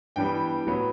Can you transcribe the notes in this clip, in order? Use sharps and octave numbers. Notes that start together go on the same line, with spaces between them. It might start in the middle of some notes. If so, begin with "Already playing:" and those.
G2 E3 G3 B3 G5
A2 F#3 B3